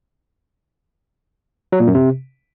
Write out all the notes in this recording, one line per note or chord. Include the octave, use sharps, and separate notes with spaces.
F#3
A#2
F#2
C3